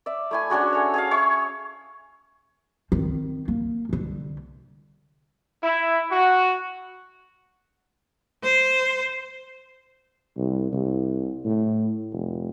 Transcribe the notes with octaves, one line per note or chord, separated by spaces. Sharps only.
D5 E5
A3 E4 G#5
C#4 D4 F#4 G#4
A4 C#5
G#4 C#5 F5
C#5 E5 C#6
D#3 C4
A#3
C2 D3
E4
F#4
C5
C2
C2
A2
F1